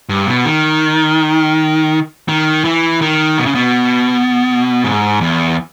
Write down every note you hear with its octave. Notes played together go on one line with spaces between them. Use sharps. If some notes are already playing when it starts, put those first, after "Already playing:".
G2
B2
D#3
D#3
E3
D#3
B2
C#3
B2
G#2
E2